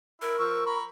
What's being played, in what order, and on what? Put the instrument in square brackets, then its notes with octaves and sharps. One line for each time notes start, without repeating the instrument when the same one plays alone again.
[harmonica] E4 [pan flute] A#4
[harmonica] F3 C#6 E6
A#5 B5 C#6